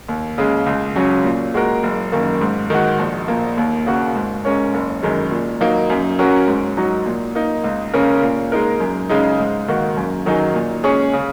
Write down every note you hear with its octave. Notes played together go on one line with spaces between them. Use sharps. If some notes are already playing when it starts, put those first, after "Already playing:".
D#2
C#3 G#3
C#2
C#3 F#3 C#4
A#2
G#3 F#4 A#4
F#1
F#2 D#3 A#3
G#2
D#3 G#3 F#4
A#1
A#2 A#3
D#2
C#3 A#3 F#4
G#2
G#3 C#4 A#4 C#5
F#1
F#2 D#3 G#3
A#2
F#3 A#3 D#4
F#2
F#3 C#4 F#4 A#4
G#2
F#3 D#4 F#4
A#2
A#3 D#4
C#2
C#3 A#3 C#4 A#4
A#2
G#3 D#4 A#4
F#2
C#3 G#3 D#4
G#2
D#3 A#3 F#4
F#2
D#3 F#3 D#4 G#4
A#2
G#3 C#4 G#4 C#5
C#3